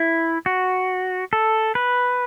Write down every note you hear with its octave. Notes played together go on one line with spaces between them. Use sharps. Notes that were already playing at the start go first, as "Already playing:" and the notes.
Already playing: E4
F#4
A4
B4